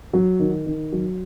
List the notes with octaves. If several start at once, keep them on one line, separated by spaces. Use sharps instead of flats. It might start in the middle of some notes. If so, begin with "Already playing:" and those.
F#3
D#3
D#3
F#3